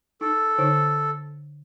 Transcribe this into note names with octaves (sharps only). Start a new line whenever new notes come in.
D#4 A4
D3 D#4 C#5